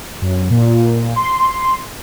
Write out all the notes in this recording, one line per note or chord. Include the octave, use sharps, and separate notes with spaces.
F#2
A#2
C6